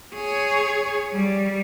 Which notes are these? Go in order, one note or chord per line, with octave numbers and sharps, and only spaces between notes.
G#4 C#5
G3